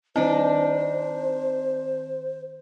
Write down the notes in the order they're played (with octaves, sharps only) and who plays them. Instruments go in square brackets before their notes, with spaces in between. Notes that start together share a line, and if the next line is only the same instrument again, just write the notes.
[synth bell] D#3 C4 [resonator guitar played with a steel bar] D4 D#4 [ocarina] C5